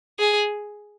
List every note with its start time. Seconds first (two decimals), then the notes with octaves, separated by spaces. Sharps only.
0.19 G#4